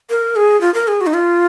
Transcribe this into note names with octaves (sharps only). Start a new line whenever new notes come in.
A#4
G#4
F4
A#4
G#4
F#4
D#4
F4